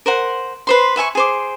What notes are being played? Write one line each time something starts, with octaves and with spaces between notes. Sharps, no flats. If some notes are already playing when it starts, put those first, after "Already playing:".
A#4 C5 F#5
B4 C5 C6
B4 E5 G#5 C#6
G#4 C5 D6